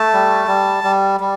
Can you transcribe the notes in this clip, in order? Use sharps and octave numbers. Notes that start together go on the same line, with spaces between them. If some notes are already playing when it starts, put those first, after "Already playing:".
Already playing: A3 A5
G3
G3
G3
G3